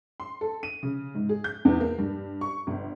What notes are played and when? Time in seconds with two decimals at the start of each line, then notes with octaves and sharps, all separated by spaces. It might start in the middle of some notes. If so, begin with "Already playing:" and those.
0.20 C6
0.41 A4
0.63 D#7
0.83 C#3
1.15 G#2
1.29 G#4
1.44 G6
1.65 E2
1.81 A#3
1.98 G2
2.41 C#6
2.67 G1